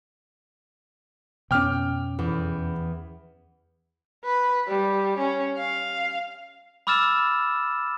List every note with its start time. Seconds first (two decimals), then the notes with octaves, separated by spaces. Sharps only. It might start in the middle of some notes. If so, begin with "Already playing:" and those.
1.51 F2 B2 C#4 G5 D6 F6
2.19 E2
4.25 B4
4.68 G3
5.18 C#4
5.58 F5
6.87 B5 D6 E6 F6 A6 E7